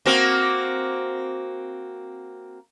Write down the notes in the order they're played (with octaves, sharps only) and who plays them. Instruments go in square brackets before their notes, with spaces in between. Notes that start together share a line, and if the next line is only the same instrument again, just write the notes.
[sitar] A#3 C4 F#4